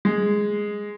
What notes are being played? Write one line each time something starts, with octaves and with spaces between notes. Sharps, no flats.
G#3